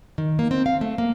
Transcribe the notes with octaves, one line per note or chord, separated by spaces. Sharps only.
D#3
A#3
C4
F5
A3
A#3